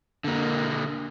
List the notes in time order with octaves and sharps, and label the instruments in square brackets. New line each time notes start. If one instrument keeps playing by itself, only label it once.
[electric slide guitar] D3 A#3